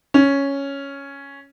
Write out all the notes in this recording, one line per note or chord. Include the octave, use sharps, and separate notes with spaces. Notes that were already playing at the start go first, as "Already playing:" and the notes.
C#4